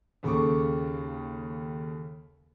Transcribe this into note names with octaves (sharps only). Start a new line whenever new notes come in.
D#2 C#3 A4 C#6 D6